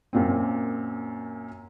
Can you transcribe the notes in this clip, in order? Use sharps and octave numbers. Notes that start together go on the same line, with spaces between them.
F#2 A#2 C4